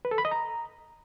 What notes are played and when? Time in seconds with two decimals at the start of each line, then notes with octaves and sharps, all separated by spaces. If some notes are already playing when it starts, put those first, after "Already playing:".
0.05 B4
0.11 A4
0.18 B5
0.25 D#5
0.31 A#5